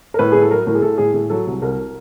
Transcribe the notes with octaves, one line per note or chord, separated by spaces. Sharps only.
A#4
A2 B4
A2 G#4
A4
F#3 A#4
A2 A#4
G#4
A2 A4
A2 G#4
A2 G#4
F#3 A4
C2
C2 A#4